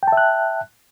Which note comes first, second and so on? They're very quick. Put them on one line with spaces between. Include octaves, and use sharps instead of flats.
G5 A5 E5 F#6